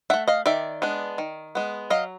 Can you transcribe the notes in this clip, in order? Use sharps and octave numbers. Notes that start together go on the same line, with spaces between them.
A3 D4 E5 F#5
D#5 F5
D#3 D5 E5
G#3 B3 D4
D#3
G#3 B3
F#3 D#5 F5